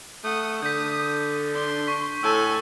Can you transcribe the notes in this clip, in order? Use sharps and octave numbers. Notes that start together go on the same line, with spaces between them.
A3 F#5 D#6
D3 D#6 G6 B6
D4 C6
C#6 B6
A2 A4 G#5 E6